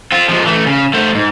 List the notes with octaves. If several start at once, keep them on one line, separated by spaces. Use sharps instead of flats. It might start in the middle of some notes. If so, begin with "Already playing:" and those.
C4 F4
F3 G#3
E3 A3
C#3
A3 C5
G#2